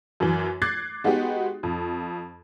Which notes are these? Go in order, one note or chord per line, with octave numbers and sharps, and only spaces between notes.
F#2 E3
D6 F#6 G#6 A6 C7
G#3 B3 D#4 F#4 G4
F2